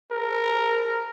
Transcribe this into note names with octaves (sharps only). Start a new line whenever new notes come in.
A#4